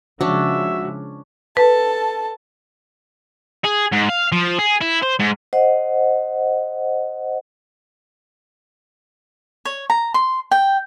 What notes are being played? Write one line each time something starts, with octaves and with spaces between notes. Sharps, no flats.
C#3 F3 G#3 C#4 D4 F#4 E5
A4 B4 A5
G#4
G#2
F5
F3
G#4
E4
C5
G#2
C5 D#5 F#5
C#5
A#5
C6
G5